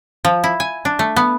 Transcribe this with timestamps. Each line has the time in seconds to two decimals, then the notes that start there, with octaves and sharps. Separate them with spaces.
0.25 F3
0.44 E4
0.60 G#5
0.85 D4
0.99 A3
1.16 B3